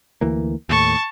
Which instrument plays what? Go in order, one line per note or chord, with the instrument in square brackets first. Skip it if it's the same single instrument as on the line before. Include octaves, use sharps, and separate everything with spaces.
[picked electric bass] D2 E3 A#3
[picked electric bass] D#2 A2 [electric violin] A5 C#6